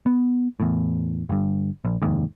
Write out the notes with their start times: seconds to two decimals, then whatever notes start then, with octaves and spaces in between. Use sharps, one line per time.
0.06 B3
0.60 E2 A2
1.29 G1 G2
1.85 A#1
2.02 F1 D#2 G#2